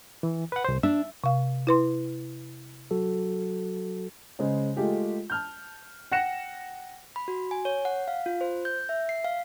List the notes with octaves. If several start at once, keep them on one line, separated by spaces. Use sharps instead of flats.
E3
B4 F#5
C2 C5
D4 E5
C3 F5
E4 B4 C6
F#3 F#4 A4
C#3 G#3 C5
G#3 A3 F4 G4 G#4
A5 F6 G6
F#5 G5 F#6 A#6 C#7 E7
B5
F#4
G#5
C#5
F#5
F5
F4
C5
G6
E5
C7
F5